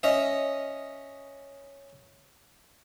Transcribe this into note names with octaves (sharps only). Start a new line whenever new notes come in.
C#4 D#5 E5